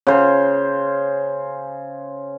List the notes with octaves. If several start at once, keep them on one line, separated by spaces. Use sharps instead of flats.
C#3 C5